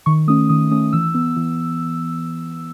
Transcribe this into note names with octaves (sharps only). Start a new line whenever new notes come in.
D#3 C#6
A3 C#4 D#6
D#3 D#6
A3 C#4 D#6
E3 E6
B3
E3